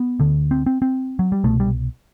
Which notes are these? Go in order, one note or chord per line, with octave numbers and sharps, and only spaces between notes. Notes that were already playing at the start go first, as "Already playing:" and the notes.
Already playing: B3
D2 D3
C4
C4
C4
F#3
G3
C2 B2 A3
G3